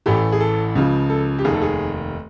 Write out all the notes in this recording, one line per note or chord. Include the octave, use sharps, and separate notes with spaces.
A1 A2 E3 A3 G4
G#4
A4
C#2 C#3 F3
A4
G4
F1 D#2 D#3 G#4
A4
G#4